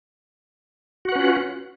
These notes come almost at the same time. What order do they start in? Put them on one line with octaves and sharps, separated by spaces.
F#4 F#5 B4 C#4 F4